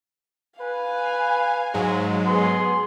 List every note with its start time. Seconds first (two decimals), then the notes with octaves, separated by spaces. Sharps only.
0.60 B4 F5 G#5
1.74 G#2 F#3 G#3
2.27 B3 G#4 C6